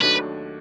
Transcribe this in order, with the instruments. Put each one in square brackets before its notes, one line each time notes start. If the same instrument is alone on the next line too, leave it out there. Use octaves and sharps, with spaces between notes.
[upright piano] D#2 D#3 F#3 A3 D4 [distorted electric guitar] B4